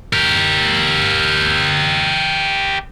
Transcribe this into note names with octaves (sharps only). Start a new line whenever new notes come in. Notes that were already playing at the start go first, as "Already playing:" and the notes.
G4 A#4